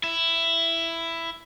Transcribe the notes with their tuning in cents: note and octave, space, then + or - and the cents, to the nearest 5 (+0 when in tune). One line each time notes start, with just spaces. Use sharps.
E4 +10